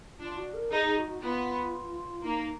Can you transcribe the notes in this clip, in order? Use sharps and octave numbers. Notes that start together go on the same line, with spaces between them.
D4 F4
F#4
A#4
D#4 G#4
G#4
F#4
F#4
B3 F4
A#3 D#4